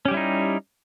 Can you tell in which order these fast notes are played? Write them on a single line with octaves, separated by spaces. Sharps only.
C#4 G4 G3 E4 D#4